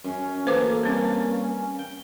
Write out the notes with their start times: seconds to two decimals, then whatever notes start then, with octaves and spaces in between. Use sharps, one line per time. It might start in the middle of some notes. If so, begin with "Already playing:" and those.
0.05 F#2 C#4
0.47 A1 D2 A#3 A4 B4 C5 D6
0.83 G2 C4 C#4 A#4
1.79 G5